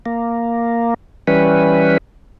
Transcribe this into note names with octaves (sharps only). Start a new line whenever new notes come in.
A#3
E3 G3 C#4 B4